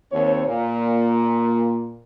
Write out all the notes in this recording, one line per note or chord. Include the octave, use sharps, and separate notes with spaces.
D#2 C4 C#5
A#2